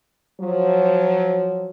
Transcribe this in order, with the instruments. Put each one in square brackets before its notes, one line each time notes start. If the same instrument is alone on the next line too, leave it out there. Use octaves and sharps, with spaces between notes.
[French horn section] F3 F#3